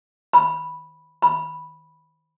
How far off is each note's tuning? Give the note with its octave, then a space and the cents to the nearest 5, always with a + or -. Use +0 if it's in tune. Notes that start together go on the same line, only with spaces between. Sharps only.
B5 -5
B5 -5